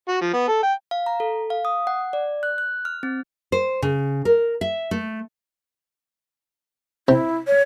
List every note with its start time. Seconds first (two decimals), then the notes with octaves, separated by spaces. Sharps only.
0.08 F#4
0.21 F3
0.34 B3
0.48 A4
0.63 G5
0.91 F5
1.06 A#5
1.20 A4
1.50 F5
1.65 D#6
1.87 F#5
2.13 D5
2.43 F#6
2.58 F#6
2.85 F6
3.03 C4
3.52 C5
3.82 C#3
4.25 A#4
4.61 E5
4.91 A3
7.08 C3 E4
7.47 C#5